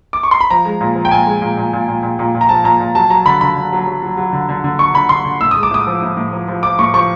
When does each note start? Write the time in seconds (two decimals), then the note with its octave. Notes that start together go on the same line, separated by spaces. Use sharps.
0.13 D6
0.23 C#6
0.31 C6
0.41 B5
0.50 F3 A#5
0.65 G#3
0.81 A#2
0.95 F3
1.05 G5
1.11 A#2 G#5
1.27 G#3
1.42 A#2
1.57 A#2
1.73 A#2
1.88 A#2
2.03 A#2
2.19 A#2
2.35 A#2
2.41 A#5
2.49 F3 A5
2.64 A#2 A#5
2.80 A#2
2.95 F#3 A5
3.10 F#3 A#5
3.26 D3 B5
3.41 D3 B5
3.57 D3
3.72 F#3
3.87 F#3
4.03 F#3
4.17 F#3
4.33 D3
4.49 D3
4.64 D3
4.79 D3 C#6
4.94 D3 B5
5.09 D3 C6
5.25 D3
5.41 A2 E6
5.51 D#6
5.56 G#3
5.63 D6
5.71 A2 D#6
5.87 F3
6.02 A2
6.17 A2
6.33 F3
6.48 F3
6.63 F3 D6
6.79 A2 C#6
6.94 F3 C#6